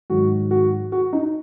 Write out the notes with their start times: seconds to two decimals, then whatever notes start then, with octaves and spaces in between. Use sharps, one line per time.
0.10 G#2 D#3 F#3 F#4
0.51 F#4
0.92 F#4
1.13 D#4